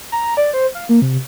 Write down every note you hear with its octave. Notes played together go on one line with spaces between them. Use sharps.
A#5
D5
C5
F5
A#3
C3